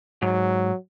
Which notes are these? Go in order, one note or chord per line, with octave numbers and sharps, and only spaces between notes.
G#2 F#3